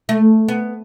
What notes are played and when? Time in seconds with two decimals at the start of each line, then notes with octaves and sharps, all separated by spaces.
0.09 A3
0.48 B3